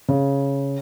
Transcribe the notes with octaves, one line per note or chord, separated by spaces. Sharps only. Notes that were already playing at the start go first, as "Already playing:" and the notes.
C#3